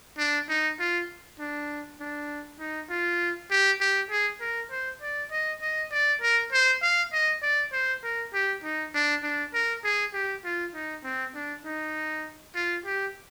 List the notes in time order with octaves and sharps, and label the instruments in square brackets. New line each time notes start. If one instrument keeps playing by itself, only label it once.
[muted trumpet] D4
D#4
F4
D4
D4
D#4
F4
G4
G4
G#4
A#4
C5
D5
D#5
D#5
D5
A#4
C5
F5
D#5
D5
C5
A#4
G4
D#4
D4
D4
A#4
G#4
G4
F4
D#4
C4
D4
D#4
F4
G4